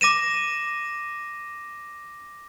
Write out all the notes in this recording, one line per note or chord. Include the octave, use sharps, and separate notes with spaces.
D6 A#6 D#7 E7